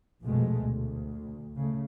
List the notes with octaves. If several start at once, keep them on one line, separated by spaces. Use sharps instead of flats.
A#1 F2 B2 G#3 A3
D2
C#3 A3